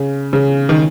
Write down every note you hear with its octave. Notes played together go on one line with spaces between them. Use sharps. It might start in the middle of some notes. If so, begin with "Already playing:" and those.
Already playing: C#3
C#3
D#3